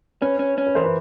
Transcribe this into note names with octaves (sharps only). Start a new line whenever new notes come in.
C#4 B4
C#4
C#4
B4
E3 A#4 C5
B4